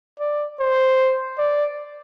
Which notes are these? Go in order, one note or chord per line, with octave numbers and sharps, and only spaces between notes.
D5
C5
D5